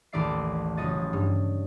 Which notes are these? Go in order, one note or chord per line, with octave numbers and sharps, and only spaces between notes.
A1 D#2 A3 D5 E5 C7
F#1 F3 F#3 C#5 D#5 A6
G2